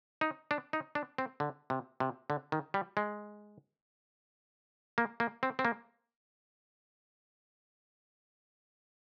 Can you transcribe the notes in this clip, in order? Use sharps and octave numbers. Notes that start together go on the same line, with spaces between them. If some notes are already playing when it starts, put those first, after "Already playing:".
D#4
D4
D#4
D4
C4
D3
C3
C3
D3
D#3
G3
G#3
A#3
A#3
C4
C4
A#3